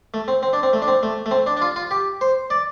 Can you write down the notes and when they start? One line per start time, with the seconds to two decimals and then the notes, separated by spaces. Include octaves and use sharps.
0.14 A3
0.28 C4
0.43 C4
0.53 D4
0.63 C4
0.73 A3
0.82 D4
0.88 C4
1.03 A3
1.26 A3
1.31 C4
1.47 D4
1.57 D4
1.62 F4
1.76 F4
1.91 G4
2.21 C5
2.50 D5